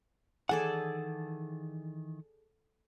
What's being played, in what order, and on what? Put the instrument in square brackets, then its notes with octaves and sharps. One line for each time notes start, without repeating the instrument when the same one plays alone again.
[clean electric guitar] D#3 E3 F#5 [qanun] G#4 A4 D5